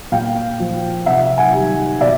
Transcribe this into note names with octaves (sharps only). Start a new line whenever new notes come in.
A#2 F5 G5
F3
C3 E5 F#5
F#5 G#5
D#3 G3
B2 D5 E5